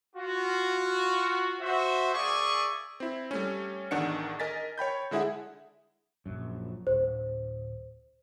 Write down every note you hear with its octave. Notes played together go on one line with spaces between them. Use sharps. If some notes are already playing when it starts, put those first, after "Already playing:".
F4 F#4
F#4 C5 E5
A#3 G#4 D5 E5 G#5 C#6
C4 E4
G3 A3 C#4
A1 E2 D#3 D4 F#5 C#7
A#4 D#5 G#5 A6 B6
C#5 G5 B5 G6
D3 G#3 E4 G#4 E5 F#5
A#1 F#2
D1 C5